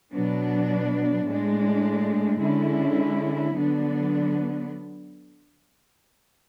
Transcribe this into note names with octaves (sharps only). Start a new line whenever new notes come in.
B2 F#3 B3 D4
A2 G#3 D4
D3 G#3 C#4 E4
D3 F#3 B3 D4